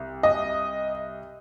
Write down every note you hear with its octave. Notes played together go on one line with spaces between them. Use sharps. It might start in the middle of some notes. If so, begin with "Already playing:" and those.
Already playing: C2
D#5